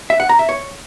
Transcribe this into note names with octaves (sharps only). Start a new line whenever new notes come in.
E5
F#5
A#5
E5
C#5